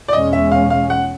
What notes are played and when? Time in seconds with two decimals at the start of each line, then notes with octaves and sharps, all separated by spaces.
0.08 D5
0.13 E2 B2 G#3 C#4 D#5
0.33 E5
0.52 F5
0.70 F5
0.90 F#5